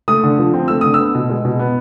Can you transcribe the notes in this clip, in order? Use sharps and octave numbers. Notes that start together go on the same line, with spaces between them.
A3 D#6
D3
F3
C4
A3 E6
D3 D#6
B3 E6
B2
G#3
B2
B3